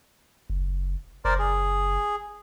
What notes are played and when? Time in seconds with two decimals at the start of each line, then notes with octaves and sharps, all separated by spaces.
0.50 F#1
1.25 F#1 A#4 C5 D5
1.39 G#4